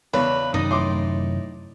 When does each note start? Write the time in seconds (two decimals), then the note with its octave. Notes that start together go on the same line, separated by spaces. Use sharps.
0.14 E2 C#3 D4 B4 C#5
0.54 F#2 C3 D#3 D#4 D5 D#6
0.71 A2 C6 D6